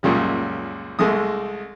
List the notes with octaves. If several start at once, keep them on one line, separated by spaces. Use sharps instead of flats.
C#2 F#2 A#2 C#3 G3
C2 G#3 A3 D#6